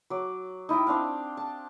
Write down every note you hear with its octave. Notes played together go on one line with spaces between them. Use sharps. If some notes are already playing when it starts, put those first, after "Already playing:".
F#3 D6
D#4 E4 D#5 G5
C4 D4 F5
A5